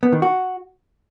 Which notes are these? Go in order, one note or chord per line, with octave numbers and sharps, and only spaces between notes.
B3
D#3
F#4